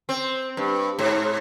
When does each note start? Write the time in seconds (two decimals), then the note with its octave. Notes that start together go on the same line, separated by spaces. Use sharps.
0.09 C4
0.57 G2
0.99 G#2